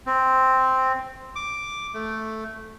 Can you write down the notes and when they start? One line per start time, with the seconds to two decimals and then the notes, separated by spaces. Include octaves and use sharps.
0.06 C4
1.36 D6
1.94 A3